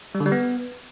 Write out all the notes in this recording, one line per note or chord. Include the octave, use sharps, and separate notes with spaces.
G3
D3
G3
B3